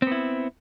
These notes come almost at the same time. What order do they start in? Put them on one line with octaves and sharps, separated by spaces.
C4 B3 E4